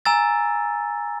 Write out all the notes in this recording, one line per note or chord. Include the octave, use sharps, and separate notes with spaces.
G#5 A#5 E6 A6